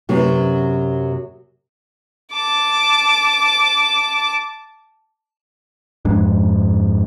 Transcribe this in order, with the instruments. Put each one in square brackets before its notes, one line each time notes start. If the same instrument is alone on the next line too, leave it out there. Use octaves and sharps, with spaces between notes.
[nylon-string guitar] F#2 C3 F#3 B3 C#4
[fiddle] A5 D6
[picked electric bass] F2 G#2 D4